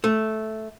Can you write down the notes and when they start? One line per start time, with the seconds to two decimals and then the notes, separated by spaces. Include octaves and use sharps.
0.04 A3